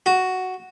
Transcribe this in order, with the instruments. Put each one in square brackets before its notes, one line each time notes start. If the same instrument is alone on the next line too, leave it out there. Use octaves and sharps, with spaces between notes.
[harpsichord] F#4